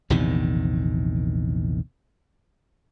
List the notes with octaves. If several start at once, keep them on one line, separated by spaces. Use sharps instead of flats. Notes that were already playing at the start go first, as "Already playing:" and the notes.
A#1 E2 C3 D#3